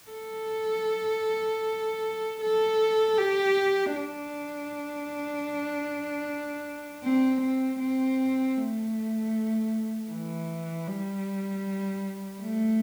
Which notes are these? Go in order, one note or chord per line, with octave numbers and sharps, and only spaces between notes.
A4
A4
G4
D4
C4
C4
C4
A3
E3
G3
A3